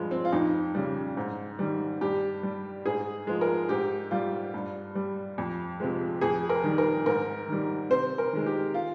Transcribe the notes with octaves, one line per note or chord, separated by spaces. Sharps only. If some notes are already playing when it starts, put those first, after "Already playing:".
Already playing: G2 F3 G#3
C4
F4
F2 D#4
C#3 G3
G#2
D#3 G3
G2 G4
G3
G#2 G#4
F3 G#3
A#4
G#2 G4
G3 F4
G2
G3
F2
C3 F3 G#3
F2 G#4
A#4
D#3 G3
A#4
G#2 A#4
D#3 G3
C3 C5
A#4
D#3 G#3
G4
F4